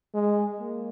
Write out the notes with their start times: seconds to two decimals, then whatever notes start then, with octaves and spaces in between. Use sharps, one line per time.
0.14 G#3
0.60 A#3